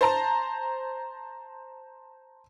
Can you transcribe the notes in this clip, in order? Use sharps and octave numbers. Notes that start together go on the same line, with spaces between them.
C5 A5 A#5